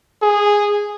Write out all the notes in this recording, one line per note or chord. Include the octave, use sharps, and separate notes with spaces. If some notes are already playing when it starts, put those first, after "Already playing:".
G#4